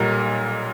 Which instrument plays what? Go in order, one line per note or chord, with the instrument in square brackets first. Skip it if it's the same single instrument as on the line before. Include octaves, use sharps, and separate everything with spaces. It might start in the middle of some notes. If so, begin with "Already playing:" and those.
Already playing: [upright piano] B1 A#2 G3 A#4